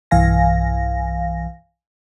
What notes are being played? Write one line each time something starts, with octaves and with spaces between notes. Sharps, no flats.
B1 G2 E3 F5 G#5 A#6